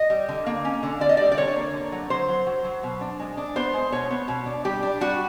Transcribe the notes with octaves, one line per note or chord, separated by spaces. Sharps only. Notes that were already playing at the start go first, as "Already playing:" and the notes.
Already playing: D#5
G3
D3
A#3
C#4
D3
D3 D5
D#5
G3 D5
D5
D3 C#5
A#3
D3
F#3
F#3 C5
F#3
F#3
F#3
B2
D4
G#3
D4
B3 C5
G#3
B2 C#5
B3
B2
D4
G3 G4
D4
G3 F#4